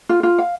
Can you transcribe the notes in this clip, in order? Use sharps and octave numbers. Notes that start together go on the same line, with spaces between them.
F4
F4
F5